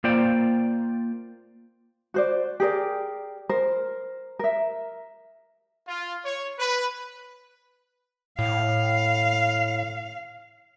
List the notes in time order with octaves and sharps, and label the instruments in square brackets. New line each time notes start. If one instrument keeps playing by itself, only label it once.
[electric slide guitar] A#3 F4 C5 D5 G5
[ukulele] F#4 C5 D5
G4 G#4 A#4 D5
A#4 C5
A#4 E5
[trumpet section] F4
C#5
B4
[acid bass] A2 [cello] F5